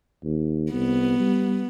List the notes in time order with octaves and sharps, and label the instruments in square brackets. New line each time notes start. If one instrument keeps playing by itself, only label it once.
[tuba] D#2
[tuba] C2 [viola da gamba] B3
[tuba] G3